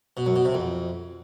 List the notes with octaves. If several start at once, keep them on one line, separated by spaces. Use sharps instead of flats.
B2
F#2
B2
C3
F2